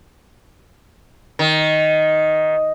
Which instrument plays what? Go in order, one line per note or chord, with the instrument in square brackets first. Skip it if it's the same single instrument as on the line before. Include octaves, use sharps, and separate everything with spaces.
[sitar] D#3